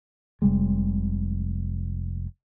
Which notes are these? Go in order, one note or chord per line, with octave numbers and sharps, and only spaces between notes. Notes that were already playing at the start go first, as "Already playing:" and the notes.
F1 C3 G3 G#3